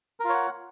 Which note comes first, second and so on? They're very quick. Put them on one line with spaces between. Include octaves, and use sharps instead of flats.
A#4 F4 C#5 F#5